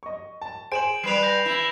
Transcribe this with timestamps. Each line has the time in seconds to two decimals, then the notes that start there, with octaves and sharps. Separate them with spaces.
0.03 D#5 C#6
0.41 A5
0.72 G#4 C5 G#5 D7 E7 F#7
1.04 G3 B4 C7 D7 F7
1.23 G6 A#6 F7
1.46 E4